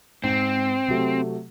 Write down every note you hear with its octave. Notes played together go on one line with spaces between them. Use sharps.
G#2 C4
C3 F#3 A3